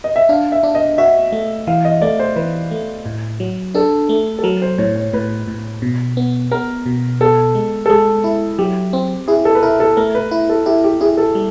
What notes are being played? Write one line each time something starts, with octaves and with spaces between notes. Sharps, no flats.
D#5
E5
D4 F5
E5
D4
D#5
F#4 E5
A3
E3 F5
D#5
A3 D5
C5
E3 B4
A3
A2
F#3
D4 A4
A3
A4
F#3 A#4
C5
A2 C#5
C#5
A2 B4
A2
B2
B3
B3 A#4
B2
B3 A4
G#3
A4
G#3 G#4
E4
F#3 G4
C4
E4 G#4
A4
B4
E4 A#4
A4
A3 A#4
B4
E4
A4
E4 G4
G4
E4 G#4
A4
G3